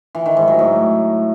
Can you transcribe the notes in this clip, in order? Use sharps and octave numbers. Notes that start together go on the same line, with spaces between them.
E3
D#3
G#2
F#3
A2